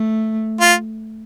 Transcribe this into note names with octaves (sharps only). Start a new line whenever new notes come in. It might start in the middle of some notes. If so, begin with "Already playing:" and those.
Already playing: A3
F4